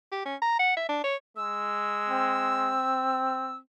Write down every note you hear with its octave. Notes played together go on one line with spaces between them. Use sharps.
G4
C#4
A#5
F#5
E5
D4
C#5
G#3 E6
C4